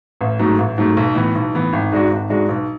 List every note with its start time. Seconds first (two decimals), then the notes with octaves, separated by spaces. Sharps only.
0.21 A1
0.39 G#2 F#3 A3
0.58 A1
0.78 G#2 F#3 A3
0.97 B1
1.15 A2 E3 B3
1.35 B1
1.54 A2 E3 B3
1.73 G#1
1.92 G#2 G#3 D4 F#4
2.11 G#1
2.29 G#2 G#3 D4 F#4
2.49 B1